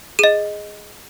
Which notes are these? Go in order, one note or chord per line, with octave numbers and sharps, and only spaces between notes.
G#4 D#5 D#7